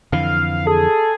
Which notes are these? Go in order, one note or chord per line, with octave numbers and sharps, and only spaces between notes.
F2 D3 E3 F5
G#4 A4